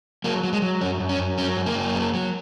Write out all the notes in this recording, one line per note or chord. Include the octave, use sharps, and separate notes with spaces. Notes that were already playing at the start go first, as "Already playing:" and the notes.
F#3 A#3
F#3
G#3
F#3
F#2 C#4
F#2
C#4
F#2
F#3 C#4
F#2
A#3
F#2
F#3
F#3